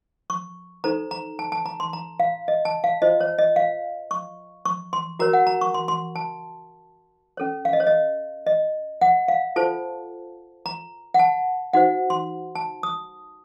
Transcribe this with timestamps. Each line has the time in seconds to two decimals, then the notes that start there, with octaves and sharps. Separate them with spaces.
0.30 C#6
0.84 D#4 A4 C5 A#5
1.11 A#5
1.39 A5
1.52 A5
1.66 A#5
1.80 C6
1.93 A#5
2.20 F5
2.48 D#5
2.65 A5
2.84 F5
3.02 F4 C5 D#5
3.20 C#5
3.38 D#5
3.56 F5
4.11 C#6
4.65 C#6
4.93 C6
5.19 F#4 A#4 C#5 A#5
5.33 F#5
5.47 A#5
5.61 C#6
5.74 C6
5.88 C6
6.16 A5
7.37 C#4 A4 C#5
7.65 F5
7.73 D#5
7.80 C#5
7.87 D#5
8.47 D#5
9.01 F#5
9.28 F5
9.56 F4 A4 C5 A5
10.66 A#5
11.14 F#5
11.19 A5
11.73 D#4 F#4 C5 F#5
12.10 C6
12.55 A5
12.83 D#6